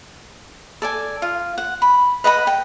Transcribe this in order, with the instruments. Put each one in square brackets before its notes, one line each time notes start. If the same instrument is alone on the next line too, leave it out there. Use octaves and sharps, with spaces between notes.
[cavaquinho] A4 D5 G#5
F4
F#5
B5
B4 D#5 F#5 B5
G5